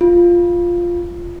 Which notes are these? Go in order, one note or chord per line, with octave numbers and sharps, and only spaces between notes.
F4